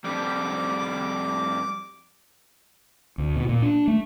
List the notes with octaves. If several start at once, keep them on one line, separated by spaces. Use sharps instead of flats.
F2 G3 D6
D2
B2
A#2
D4
A3